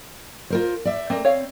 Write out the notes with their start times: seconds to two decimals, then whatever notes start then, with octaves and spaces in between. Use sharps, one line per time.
0.50 F4 A#4 C5
0.85 D5 E5
1.10 A3 A#3 C4
1.25 C#5 F5